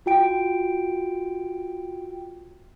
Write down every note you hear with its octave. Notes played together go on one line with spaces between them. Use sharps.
F4 F#4 G5 D7